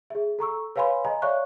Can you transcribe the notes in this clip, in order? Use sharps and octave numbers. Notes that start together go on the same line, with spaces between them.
G#4 E5
A4 A#5 C#6 E6
B4 C#5 F5 G#5 B5 C6
D#5 G#5 A#5
C#5 D5 E5 F5 C#6 F#6